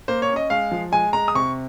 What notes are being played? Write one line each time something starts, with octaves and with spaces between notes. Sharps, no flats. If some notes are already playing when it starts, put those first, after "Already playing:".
A#3 C5
C#5
C#4
D#5
G#3 F5
F3
G#3 G#5
G#3 A#5
D#6
C3 C#6